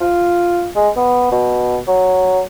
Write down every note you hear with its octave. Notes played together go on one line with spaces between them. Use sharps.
F4
G#3
B3
B2
F#3